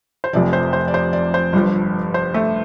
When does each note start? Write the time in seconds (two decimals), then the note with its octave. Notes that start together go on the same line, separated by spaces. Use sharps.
0.24 C5
0.33 F1 F2 C3 F3 D5
0.53 C5
0.73 C5
0.88 D5
0.94 C5
1.13 D5
1.34 C5
1.53 G1 G2 F3
2.14 C5
2.34 A3